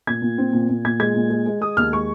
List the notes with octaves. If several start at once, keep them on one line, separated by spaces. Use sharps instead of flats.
A#2 G#6
A#2
C4
A#2
A#2
A#2 G#6
G#3 G#6
A#2
G#3
G#3
G#3 D#6
D#2 F6
G#3 C#6